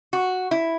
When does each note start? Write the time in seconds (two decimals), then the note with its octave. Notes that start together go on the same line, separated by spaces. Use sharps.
0.13 F#4
0.51 E4